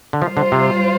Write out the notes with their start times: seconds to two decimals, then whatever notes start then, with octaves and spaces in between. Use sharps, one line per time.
0.13 D3
0.21 F3 G3 F4 C5
0.37 D3
0.52 C3